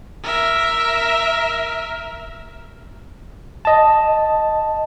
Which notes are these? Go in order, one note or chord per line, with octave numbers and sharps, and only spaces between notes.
A#4 E5
D#5 A5